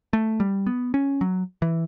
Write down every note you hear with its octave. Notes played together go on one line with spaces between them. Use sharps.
A3
G3
B3
C#4
F#3
E3